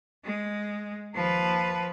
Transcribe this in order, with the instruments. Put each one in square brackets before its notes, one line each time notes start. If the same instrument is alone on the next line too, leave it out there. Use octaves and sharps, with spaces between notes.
[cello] G#3
[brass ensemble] D#2 A5 [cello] F3 B4